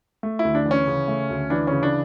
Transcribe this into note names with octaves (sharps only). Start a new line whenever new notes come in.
A3
E4
D2
D4
E3
C#4
C#3
A3
D2
E3 D4
C#3 C#4
D4